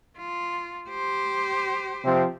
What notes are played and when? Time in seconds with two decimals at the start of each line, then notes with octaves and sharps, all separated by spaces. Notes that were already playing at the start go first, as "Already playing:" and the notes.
0.18 F4
0.90 G4 C5
2.05 C3 F3 C4